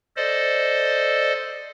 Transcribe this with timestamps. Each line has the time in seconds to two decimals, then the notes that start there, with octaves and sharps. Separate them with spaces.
0.16 A4 C5 D5 D#5